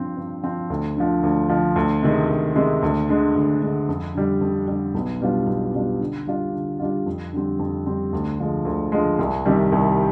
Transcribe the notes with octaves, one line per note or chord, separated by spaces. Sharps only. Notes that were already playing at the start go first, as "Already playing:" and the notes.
Already playing: G2 F3 C4
G2
F3 C4
D2
D3 F3
D2
D3 F3
D2
C3 D#3 G#3
D2
C3 D#3 G#3
D2
D3 G#3
D2
D3 G#3
F2
D3 G3
F2
D3 G3
B1
B2 G3 D4 F4
B1
B2 G3 D4 F4
D3
G3 D4 F4
D3
G3 D4 F4
F2
D3 G3 C4
F2
D3 G3 C4
D2
D3 F3 G#3
D2
D3 F3 G#3
C2
C3 D#3 G3
C2